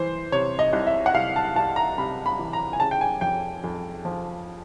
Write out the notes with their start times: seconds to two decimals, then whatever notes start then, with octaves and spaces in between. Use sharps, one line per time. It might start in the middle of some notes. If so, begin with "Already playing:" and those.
Already playing: E3 C5
0.32 C3 C#5
0.59 D#5
0.73 C2
0.87 E5
1.06 F#5
1.14 C2 F5
1.36 A5
1.56 C2 A5
1.76 A#5
1.98 C3 B5
2.26 B5
2.39 E3
2.53 A#5
2.73 G#5
2.80 C#3 A5
2.91 G5
3.01 G#5
3.21 F2 G5
3.64 F2
4.05 F3